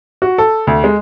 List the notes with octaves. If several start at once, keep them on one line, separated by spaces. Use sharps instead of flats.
F#4
A4
D2
G#3